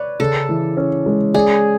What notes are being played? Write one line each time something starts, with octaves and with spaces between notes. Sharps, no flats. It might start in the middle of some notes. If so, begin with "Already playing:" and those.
Already playing: B4 C#5 D5
C#3 A4
E3
C#4
G#3
G#4 D5